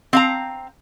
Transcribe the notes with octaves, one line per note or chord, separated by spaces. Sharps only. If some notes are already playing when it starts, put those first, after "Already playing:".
C4 F5 A#5